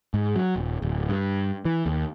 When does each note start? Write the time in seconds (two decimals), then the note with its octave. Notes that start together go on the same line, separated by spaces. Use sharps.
0.14 G#2
0.36 F#3
0.56 D#1
0.82 D1
1.09 G2
1.65 E3
1.86 D#2